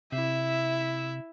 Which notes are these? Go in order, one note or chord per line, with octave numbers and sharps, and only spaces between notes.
C3 E4 E5